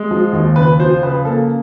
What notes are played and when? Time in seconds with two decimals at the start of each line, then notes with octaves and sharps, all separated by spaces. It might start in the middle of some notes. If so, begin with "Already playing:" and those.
Already playing: G#3
0.11 F3
0.33 D#2
0.56 C#3 B4
0.80 F3 C5
1.03 C#3 B4
1.25 A#3 A4